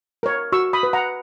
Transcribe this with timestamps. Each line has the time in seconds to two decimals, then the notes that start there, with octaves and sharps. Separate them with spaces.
0.23 A#4 C#5
0.52 F#4 C#6 E6
0.73 B5 D#6
0.83 B4
0.93 F#5 A#5